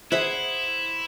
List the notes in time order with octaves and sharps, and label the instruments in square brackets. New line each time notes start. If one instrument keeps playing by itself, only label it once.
[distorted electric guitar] E4 [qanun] G#4 E5 F#5 [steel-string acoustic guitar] C5